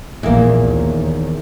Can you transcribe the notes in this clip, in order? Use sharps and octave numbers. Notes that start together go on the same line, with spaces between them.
A#1 E2 A#2 A#3
D#2